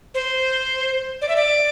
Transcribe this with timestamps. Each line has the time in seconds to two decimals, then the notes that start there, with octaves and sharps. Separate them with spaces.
0.14 C5
1.22 D5
1.29 E5
1.36 D5